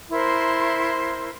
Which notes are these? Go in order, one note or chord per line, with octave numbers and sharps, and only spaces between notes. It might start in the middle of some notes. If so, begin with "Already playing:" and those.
E4 A#4 C5 C6